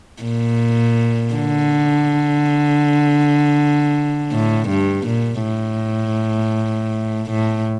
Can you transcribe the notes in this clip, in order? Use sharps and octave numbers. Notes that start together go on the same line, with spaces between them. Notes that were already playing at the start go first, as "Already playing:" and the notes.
A#2
D3
A2
G2
A#2
A2
A2